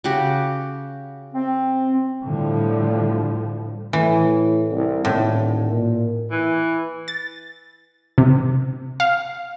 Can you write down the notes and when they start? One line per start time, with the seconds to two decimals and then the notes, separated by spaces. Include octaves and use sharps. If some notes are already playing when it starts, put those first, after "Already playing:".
0.04 C#3 F#4 G4
1.32 C4
2.24 A2 D3 F3 G3
3.93 A2 E3
4.71 C2
5.05 D#1 A2
5.72 A#2
6.31 E3
7.08 A6
8.18 C3
9.00 F5